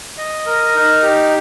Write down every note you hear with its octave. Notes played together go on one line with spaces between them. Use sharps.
D#5
A#4
D#4
G4